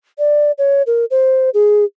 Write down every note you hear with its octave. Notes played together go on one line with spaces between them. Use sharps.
D5
C#5
A#4
C5
G#4